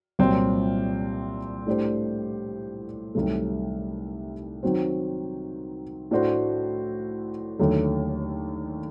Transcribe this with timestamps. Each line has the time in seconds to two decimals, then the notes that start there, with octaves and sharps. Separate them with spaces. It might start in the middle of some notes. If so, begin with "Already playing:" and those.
0.19 C2 A#2 F#3 C4
1.66 A2 A3 D4 G4 C5
3.15 C2 C3 D#3 F#3 A3
4.63 D#3 F#3 C4 F#4 C5
6.11 A2 A3 D4 F#4 C5
7.59 D#2 D3 F#3 A3